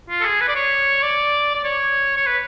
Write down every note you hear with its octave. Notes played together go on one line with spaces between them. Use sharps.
F4
A4
G#4
B4
D5
C#5
D5
D5
C#5
C#5
B4